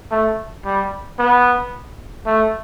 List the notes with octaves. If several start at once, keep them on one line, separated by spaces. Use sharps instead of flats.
A3
G3
B3
A3